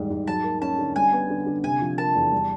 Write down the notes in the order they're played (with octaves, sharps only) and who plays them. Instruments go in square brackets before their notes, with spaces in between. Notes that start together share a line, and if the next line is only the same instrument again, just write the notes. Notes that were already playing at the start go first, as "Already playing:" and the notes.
Already playing: [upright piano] E2 G#2 D#3 G3
G#2
[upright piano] F#3 [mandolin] A5
[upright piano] A#3
[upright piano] C#4 [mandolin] A5
[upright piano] D3
[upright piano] G3 [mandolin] G#5
[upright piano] B3
D3
D3
[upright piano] C3 [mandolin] G#5
[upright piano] F3
[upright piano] A#3 [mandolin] A5
[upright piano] E2
G3